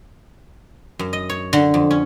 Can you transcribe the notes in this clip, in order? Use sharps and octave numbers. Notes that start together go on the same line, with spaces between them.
F#2
D#5
C#5
D3
F2
C#4